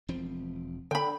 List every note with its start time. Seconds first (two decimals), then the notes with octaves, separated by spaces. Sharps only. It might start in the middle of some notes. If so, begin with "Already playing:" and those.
0.09 E1 F3 C4
0.91 D3 G5 B5